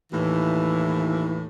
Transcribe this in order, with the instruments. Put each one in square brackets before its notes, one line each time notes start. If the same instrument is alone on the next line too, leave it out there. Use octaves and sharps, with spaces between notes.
[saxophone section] D#2 A2 E3